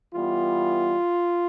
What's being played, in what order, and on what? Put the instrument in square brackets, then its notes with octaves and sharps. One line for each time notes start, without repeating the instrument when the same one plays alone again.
[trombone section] E3 G3 B3 F4